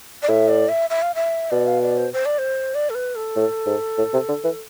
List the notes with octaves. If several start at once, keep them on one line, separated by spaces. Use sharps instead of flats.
D5
A2 E5
D5
E5
E5
F5
E5
B2 D5
F5
D5
C5
C5
D5
C5
D5
A4
B4
A4
A2
G#2
A2
C3
D3
E3